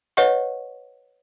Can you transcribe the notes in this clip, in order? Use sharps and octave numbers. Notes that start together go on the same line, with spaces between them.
B4 C#5 D#5 F#5 C#6